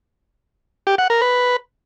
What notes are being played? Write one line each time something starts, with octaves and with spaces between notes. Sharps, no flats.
G4
F#5
A#4
B4